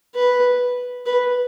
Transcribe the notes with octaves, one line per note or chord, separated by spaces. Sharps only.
B4
B4